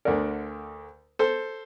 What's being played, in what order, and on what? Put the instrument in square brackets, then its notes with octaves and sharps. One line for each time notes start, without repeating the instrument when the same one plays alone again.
[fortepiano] D2 D3 A3 A#4 D5
A4 C5